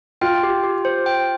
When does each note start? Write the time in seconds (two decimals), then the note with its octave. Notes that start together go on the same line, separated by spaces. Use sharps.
0.21 F4 G5
0.43 G4
0.63 G4
0.85 C5
1.06 G5